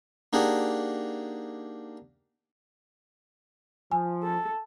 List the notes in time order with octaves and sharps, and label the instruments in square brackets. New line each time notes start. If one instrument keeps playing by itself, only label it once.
[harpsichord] A#3 D4 D#4 G4 G#4 F#5
[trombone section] F3 [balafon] G#5
[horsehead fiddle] A4